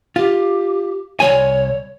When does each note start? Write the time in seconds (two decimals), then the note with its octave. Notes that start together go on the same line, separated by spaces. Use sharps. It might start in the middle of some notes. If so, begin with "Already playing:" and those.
0.16 F4 G4
1.20 C2 F3 C#5 G#5